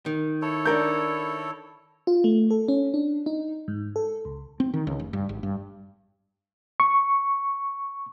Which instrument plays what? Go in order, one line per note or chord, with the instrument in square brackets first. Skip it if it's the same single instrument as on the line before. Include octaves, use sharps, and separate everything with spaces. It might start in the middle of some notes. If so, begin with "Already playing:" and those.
[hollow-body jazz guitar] D#3
[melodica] E4 A4 C#5
[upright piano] D4 A#4 G6
[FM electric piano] F4
A3
A4
C#4
D4
D#4
G#2
A4
C#2
[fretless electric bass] C4
D#3
C#2
F1
G2
G#1
G2
[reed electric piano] C#6